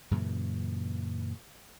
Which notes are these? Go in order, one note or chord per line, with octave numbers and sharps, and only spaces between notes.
F#2 A#2 C#3 E3